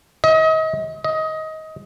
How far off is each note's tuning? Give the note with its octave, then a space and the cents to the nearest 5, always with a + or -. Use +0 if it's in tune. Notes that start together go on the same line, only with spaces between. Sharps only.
D#5 +35
D#5 +20